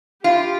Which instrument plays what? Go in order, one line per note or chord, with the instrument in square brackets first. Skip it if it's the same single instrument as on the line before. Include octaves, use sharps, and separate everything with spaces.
[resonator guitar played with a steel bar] F4 [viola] G4